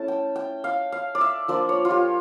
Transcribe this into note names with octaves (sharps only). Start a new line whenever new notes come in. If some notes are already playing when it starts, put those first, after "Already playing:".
Already playing: A3 C#4 E4 A5
G5
G5
F5
F5
D5
E5
F3 A#3 D4 F4 D5
C#5
F4
G4